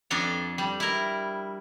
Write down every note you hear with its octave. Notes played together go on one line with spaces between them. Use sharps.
F2 D4 A4 A#5
G3
E4 A#4